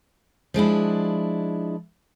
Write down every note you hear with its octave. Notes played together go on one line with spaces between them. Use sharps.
F3 G#3 D4 E4